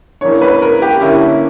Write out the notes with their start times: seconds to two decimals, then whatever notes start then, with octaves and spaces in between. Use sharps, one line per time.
0.21 C#3 E3 A#3 D4 C#5
0.41 B4
0.62 A#4
0.82 G4
1.01 D3 A#3 C#4 E4